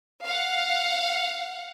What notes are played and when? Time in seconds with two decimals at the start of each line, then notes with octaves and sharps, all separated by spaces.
0.24 F5 F#5